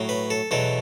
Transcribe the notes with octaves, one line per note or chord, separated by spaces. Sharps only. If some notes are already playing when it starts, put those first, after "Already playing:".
Already playing: A2 F#3
B4
A4
E2 B2 F#3 A4